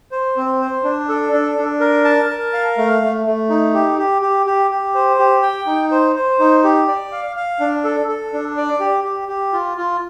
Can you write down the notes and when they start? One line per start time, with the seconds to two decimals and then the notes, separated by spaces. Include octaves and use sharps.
0.12 C5
0.37 C4
0.61 C5
0.84 D4
1.09 A4
1.32 D4
1.58 D4
1.80 A#4
2.05 A5
2.29 A#4
2.53 F5
2.78 A3
3.02 A3
3.26 A3
3.50 D#4
3.74 G4
3.98 G4
4.22 G4
4.46 G4
4.71 G4
4.95 C5
5.19 G4
5.43 G5
5.66 D#4
5.91 C5
6.16 C5
6.40 D#4
6.64 G4
6.88 D5
7.12 F5
7.36 F5
7.60 D4
7.84 A4
8.08 A4
8.33 D4
8.57 D5
8.80 G4
9.04 G4
9.28 G4
9.53 F4
9.77 F4